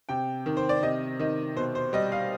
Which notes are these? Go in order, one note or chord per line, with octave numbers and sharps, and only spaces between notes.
C3 G5
D#3
C5
D5
C3 D#5
D#3 D#5
B2 C5
C5
G3 D#5
F5